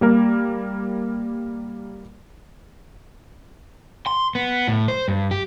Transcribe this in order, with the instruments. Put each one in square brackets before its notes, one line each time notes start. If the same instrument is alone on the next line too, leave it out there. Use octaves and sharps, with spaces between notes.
[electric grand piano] G3 A#3 A#4
[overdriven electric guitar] C6
B3
A2
C5
G2
G4